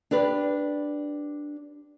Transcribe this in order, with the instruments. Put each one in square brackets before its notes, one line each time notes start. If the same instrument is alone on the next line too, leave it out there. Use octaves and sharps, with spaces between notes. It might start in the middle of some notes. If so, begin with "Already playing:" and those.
[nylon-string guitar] D4 G4 B4 D5